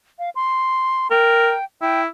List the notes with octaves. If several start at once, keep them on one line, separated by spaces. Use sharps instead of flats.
F5
C6
A#4 G5
E4 G5